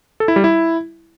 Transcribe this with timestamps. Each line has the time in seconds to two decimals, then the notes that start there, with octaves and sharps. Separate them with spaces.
0.20 A4
0.28 E4
0.36 G3
0.44 E4